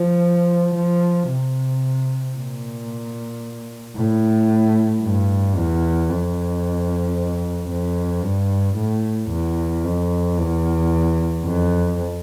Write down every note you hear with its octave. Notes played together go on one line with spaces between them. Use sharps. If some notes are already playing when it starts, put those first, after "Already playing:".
Already playing: F3
F3
C3
A#2
A2
G2
E2
F2
F2
G2
A2
E2
F2
E2
F2